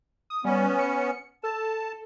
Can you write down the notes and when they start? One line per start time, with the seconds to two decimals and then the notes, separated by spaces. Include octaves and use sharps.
0.30 D#6
0.45 G3 B3 C#4
0.79 C#7
1.43 A4 A5